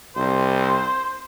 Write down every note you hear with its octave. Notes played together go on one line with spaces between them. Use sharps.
C2 C5